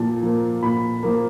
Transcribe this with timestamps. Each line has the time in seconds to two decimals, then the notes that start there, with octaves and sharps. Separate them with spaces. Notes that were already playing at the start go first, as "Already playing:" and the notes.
Already playing: A#2 F3 A5
0.23 F3 A#3
0.62 A#2 B5
1.03 F3 A#3